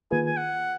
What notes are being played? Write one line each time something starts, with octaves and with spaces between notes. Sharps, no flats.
D#3 A#3 F4 G#4 B4 G#5
G#5
F#5